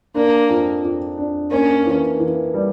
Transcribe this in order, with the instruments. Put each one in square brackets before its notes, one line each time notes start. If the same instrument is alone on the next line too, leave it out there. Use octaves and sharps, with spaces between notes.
[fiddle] A#3 [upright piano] D4
[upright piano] F2
F2
D4
[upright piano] A#3 [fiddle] C#4
[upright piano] E3
E3
G3